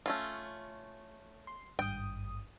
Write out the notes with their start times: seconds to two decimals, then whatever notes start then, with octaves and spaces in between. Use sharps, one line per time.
0.06 A3 C#4 F4
1.47 C6
1.79 G#1 G2 G5 D#6